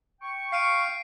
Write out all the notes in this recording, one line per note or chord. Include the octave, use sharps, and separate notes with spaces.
G5 C#6
F5 C7 D7 D#7